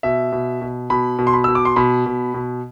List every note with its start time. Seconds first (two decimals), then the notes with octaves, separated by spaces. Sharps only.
0.03 B2 E5
0.32 B2
0.62 B2
0.90 B2 B5
1.19 B2
1.27 C6
1.33 B5
1.44 B2 E6
1.55 D6
1.65 C6
1.76 B2 B5
2.06 B2
2.34 B2